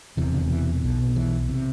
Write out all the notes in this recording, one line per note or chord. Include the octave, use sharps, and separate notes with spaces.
E1 E2 C3 E3
D3
E3
B1 B2
E3
C3